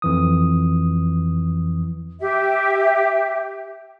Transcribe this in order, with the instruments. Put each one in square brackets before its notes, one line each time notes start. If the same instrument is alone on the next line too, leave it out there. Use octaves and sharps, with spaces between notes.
[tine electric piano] F2 E3 D#6
[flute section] G4 E5